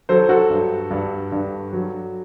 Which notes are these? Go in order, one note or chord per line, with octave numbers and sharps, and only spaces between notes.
F#3 A4 C5
F#4 A4
G2
G2
G2
F#3